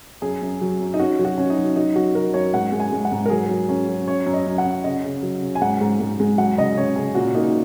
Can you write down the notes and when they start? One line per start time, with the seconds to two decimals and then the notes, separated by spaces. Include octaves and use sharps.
0.22 F#2 G#4
0.42 F#2
0.61 F#3
0.79 F#2
0.94 D#4
0.99 C#4 F#4
1.19 F#3
1.25 F#4
1.38 C#4
1.50 D#4
1.57 F#3
1.76 F#3 D#4
1.95 F#3 F#4
2.15 F#3 A#4
2.34 F#2 C#5
2.54 G#2 F#5
2.72 G#3
2.80 G#5
2.92 G#3
3.05 F#5
3.12 G#2
3.26 A#4
3.30 F#3 G#4
3.49 F#3
3.69 C#4
3.89 F#3
4.07 C#4 C#5
4.26 F#2
4.33 D#5
4.47 F#2
4.58 F#5
4.65 C#4
4.84 C#3 D#5
5.04 C#3
5.23 F#3
5.42 C#3
5.55 G#5
5.61 G#2 F#5
5.81 G#2
6.00 G#2
6.20 G#3
6.38 F#3 F#5
6.57 C#3 D#5
6.77 C#3 C#5
6.96 C#3 G#4
7.15 A#2 F#4
7.35 A#3 D#4